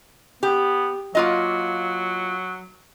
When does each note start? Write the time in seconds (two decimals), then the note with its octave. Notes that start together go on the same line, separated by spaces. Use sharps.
0.43 B3 G4
1.15 F#3 A#3 F4 D#5